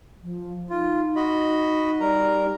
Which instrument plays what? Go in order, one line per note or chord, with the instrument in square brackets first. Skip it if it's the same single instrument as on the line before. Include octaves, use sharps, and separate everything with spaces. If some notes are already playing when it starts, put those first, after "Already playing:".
[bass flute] F3
[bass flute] D#4 [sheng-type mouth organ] F4
[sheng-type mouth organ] F#4 D#5 B5
[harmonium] G3 [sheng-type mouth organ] A#4 A#5